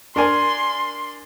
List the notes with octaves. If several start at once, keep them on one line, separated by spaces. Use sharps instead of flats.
D4 A#4 G#5 C6